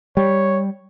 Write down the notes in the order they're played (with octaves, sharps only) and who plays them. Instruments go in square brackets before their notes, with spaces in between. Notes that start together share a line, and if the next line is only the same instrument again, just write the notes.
[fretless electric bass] G3 [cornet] C#5